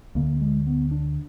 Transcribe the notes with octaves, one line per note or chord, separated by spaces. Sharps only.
D2 D3 A#3
G#3
B3
D4